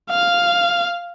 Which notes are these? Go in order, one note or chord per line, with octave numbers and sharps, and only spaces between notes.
F5